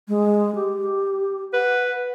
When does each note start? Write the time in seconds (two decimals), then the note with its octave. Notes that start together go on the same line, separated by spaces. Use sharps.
0.08 G#3
0.55 G4
1.54 B4 F#5